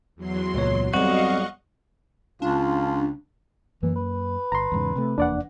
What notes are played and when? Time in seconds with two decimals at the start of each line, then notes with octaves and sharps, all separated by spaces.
0.16 E2 F#3 C6
0.54 C#2 A#2 C#5
0.94 B1 G2 C4 F#4 D#5 F5 C#6
2.42 C#2 D4 F4
3.83 F#2 E3 A#3
3.96 B4
4.52 G1 A#5 C6
4.72 E2 G#2 C#3
4.95 C3 A3
5.18 F1 E2 A#3 D4 D5 F#5